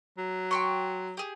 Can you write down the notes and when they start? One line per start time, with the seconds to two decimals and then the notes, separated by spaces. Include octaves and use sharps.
0.18 F#3
0.51 G5 C6 C#6
1.17 G4 G#4